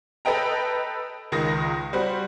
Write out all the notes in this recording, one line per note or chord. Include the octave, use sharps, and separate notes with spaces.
A4 B4 D#5 G5 A#5
C#2 D#3 D#6 A#6
G3 F#4 C5